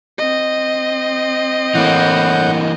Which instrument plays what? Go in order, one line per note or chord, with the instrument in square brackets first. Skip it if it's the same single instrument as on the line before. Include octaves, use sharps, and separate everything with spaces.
[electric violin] C4 D#5
[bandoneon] A2 F#5 G6 [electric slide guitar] E3 A#3